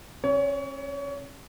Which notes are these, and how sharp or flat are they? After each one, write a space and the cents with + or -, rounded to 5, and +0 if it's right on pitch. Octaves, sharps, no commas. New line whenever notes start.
C#4 -35 C#5 +30